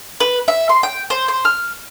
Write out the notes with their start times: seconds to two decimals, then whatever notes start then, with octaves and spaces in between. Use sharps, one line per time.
0.20 B4
0.48 E5
0.69 C6
0.83 G5
1.10 C5
1.28 C5
1.45 F6